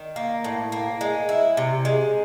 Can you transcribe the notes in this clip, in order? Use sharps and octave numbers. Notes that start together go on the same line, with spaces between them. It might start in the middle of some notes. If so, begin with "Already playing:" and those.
Already playing: D#3
A#3
A2
A#3
G#3
E4
C3
G#3